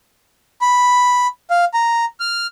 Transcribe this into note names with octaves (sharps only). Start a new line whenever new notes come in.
B5
F5
A#5
F6